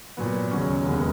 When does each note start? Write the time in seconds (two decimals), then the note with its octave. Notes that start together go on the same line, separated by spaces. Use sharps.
0.17 A#2 F#3 B3
0.51 D#2 C#3 F#3 C#4
0.86 E1 D#2 C#3 G#3 B3